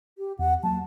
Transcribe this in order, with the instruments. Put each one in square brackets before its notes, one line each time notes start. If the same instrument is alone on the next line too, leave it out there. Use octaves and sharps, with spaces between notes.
[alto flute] G4
[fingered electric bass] E2 [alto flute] F#5
[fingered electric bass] F#3 A#3 [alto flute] A5